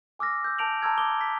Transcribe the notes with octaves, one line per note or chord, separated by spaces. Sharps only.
G#5 D6 E6 F6 A#6
E6 G6
A5 G6 D7 F7 F#7
A5 A#5 C6 E6 F6 G#6
D6 D#6 G7
B6